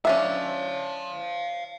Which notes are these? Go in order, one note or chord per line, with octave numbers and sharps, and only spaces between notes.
C#4 D4 E5 F5 A5